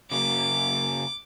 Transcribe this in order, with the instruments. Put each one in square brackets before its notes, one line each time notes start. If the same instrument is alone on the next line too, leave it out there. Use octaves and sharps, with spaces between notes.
[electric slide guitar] C#3 F#3 A#3 [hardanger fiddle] D6